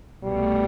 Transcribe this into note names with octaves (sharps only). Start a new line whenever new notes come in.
C2 B2 G3 A3